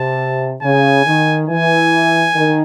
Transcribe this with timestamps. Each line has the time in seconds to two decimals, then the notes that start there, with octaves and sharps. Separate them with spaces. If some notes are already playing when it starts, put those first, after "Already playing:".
Already playing: C3 A5
0.63 C#3 G#5
1.06 D#3
1.49 E3 G#5
2.35 D#3